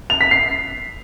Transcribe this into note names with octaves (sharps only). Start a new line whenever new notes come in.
F7
B6
C7